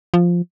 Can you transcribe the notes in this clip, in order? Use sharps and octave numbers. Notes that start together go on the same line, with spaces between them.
F3